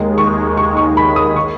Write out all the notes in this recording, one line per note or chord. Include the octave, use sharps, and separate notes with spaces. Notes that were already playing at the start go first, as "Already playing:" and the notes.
Already playing: D#2 D#3 G#3
C#6
C#6
C#6
B5
D#6
C#6